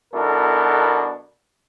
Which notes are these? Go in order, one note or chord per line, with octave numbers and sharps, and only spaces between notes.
B1 B2 D4 E4 A4 A#4